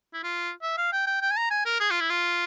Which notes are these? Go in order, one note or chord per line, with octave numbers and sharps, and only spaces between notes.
E4
F4
E5
F5
G5
G5
G5
G#5
A#5
G#5
A#4
G#4
F4
E4
F4